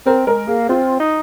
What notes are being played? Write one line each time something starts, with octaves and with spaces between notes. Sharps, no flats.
C4 A#4
G#3 A#4
A#3 G#4
C4 F4
D#4